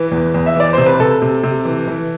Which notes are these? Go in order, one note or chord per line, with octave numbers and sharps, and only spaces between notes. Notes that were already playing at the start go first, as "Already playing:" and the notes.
Already playing: E3 B4
E2
E2
E5
E3 D5
C3 C5
B4
C3 A4
C3
C3
E3
E3